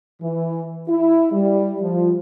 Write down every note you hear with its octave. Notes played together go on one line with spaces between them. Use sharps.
E3
E4
G3
F3